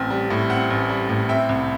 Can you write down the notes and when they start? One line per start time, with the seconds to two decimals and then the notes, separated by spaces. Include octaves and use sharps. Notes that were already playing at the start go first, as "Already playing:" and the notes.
Already playing: A1 C4
0.10 G3
0.30 A2
0.50 C4 F#5
0.70 A1
0.89 G3
1.09 A2
1.29 C4 E5 G5
1.49 C2